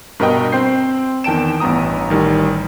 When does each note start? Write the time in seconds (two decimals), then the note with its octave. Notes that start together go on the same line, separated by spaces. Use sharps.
0.20 G2 B2 A#4 B4 D#5 G5
0.52 C4 C5 G5 G6 C7
1.24 E2 D#3 G5 A5 D7 E7
1.60 A1 G2 B3 A#5 D#6
2.10 A1 D#3 G3